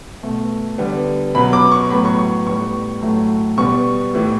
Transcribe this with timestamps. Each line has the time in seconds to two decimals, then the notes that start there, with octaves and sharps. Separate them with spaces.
0.23 B2 A3
0.78 D3 G3 B3
1.35 B2 F#3 B3 B5
1.53 D6
1.72 C#6
1.90 A2 F#3 B3 B5
2.05 C#6
2.18 C#6
2.47 A2 G3 B3 C#6
3.01 A2 F#3 A3
3.57 B2 G3 B3 C#6
4.14 A2 E3 B3